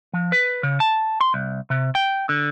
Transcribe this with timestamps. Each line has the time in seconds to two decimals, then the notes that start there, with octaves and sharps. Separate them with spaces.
0.13 F3
0.32 B4
0.63 C#3
0.80 A5
1.21 C6
1.34 C2
1.70 C3
1.95 G5
2.29 D3